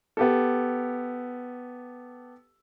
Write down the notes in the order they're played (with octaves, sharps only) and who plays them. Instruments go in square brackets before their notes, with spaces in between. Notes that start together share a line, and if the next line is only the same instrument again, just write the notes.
[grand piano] B3 G4 A4